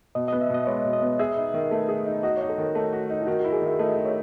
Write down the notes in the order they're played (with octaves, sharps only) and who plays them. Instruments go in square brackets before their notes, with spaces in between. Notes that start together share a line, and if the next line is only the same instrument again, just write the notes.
[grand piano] B2 [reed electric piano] D#5
[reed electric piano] D#5
[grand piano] B3
[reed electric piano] E5
[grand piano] B2 [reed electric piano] D#5
[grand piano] G#3 [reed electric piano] C#5
[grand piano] B2
[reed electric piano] D#5
[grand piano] B3
[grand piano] G#4 [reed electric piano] E5
[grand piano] D#4
D#3
A3
G#4
D#4
[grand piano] F#4 [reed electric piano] D#5
[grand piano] D#4 [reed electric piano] C#5
[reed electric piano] A4
[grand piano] D#3
A3
F#4
D#4
[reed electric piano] E4
[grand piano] D#3 [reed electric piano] F#4
[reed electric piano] F#4
[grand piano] E4
[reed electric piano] G#4
[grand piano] D#3 [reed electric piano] E5
[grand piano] A3 [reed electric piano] D#5
[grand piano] D#3
[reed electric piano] C#5